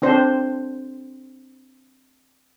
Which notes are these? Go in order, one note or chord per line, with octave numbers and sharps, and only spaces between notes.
C4 D4 C5